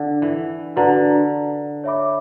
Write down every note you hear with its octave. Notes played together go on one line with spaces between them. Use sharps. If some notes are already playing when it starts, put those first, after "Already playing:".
Already playing: D3
E3
D3 F#4 B4 D5 A#5
C#5 E5 B5 D6